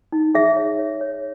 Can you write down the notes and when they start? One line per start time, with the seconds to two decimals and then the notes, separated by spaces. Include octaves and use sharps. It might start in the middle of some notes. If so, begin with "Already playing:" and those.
0.12 D#4
0.35 G#4 E5
0.56 C#5
0.79 C#5
1.01 C#5